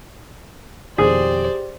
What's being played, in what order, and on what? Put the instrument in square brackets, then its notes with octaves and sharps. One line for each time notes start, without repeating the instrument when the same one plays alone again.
[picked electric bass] F2 B2 D#3 [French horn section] G4 [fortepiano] G#4 [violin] C5 D5